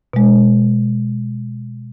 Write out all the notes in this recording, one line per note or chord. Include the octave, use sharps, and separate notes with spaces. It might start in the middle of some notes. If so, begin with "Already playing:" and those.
B2 G#3